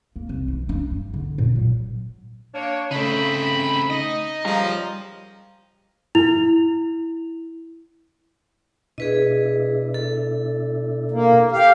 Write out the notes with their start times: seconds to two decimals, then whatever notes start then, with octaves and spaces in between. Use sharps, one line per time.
0.16 A#3
0.29 C2
0.48 E3
0.69 D4
0.91 G2
1.14 D3
1.38 A#2
1.55 F#3
2.54 A#3 D4 C#5
2.91 C#3 A3 C4 D#4 B5
3.90 D#4 D#5
4.45 A#2 C#3 F3 G3 G4 A#5
6.15 E4 F7
8.98 B2 D4 E4 G#4 B4 D#5
9.94 A4
11.11 A#3
11.52 G4 F5